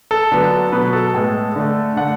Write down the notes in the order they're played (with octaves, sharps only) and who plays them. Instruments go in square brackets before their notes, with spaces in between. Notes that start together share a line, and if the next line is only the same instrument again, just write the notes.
[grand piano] A4
D3 F#3 B3
B2 F#3 B3 B4
A4
A2 G#3 B3
D3 A3
D3 A3 F#5